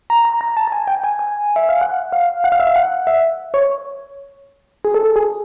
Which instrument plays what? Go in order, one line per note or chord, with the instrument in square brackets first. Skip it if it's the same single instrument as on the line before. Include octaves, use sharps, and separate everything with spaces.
[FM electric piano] A#5
A#5
A#5
A5
A5
G#5
G5
G#5
G#5
E5
F5
F#5
F5
F#5
F5
E5
F5
F#5
E5
C#5
G#4
A4
G#4